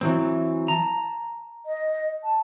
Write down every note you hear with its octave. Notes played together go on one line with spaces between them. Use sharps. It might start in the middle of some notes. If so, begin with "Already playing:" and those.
E3 F#3 C4
A5 A#5
D#5
A5